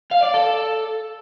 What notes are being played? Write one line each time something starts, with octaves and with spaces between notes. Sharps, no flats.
F5
D5
A4